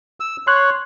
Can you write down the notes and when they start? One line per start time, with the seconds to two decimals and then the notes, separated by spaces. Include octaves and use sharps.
0.20 E6
0.47 C#5 C6 F#6